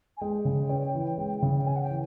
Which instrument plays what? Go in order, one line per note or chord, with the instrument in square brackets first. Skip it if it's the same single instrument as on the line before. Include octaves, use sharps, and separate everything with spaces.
[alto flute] G#5
[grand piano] G#3 [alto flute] G5
[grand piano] C#3
C#4
E3
G#3
C#3
[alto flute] G5
[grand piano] C#4 [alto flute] G#5
[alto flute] F#5
G5
[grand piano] E3